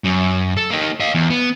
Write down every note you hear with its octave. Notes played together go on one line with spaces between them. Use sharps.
F#2
A4
A#3 D#4
D#5 F5
E2
B3